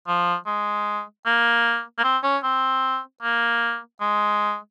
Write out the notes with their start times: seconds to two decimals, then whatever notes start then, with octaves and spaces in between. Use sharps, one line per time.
0.08 F3
0.46 G#3
1.26 A#3
1.98 A#3
2.04 C4
2.23 C#4
2.43 C4
3.23 A#3
4.01 G#3